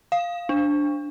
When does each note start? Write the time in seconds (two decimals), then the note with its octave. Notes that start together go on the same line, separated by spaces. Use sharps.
0.12 F5
0.49 D4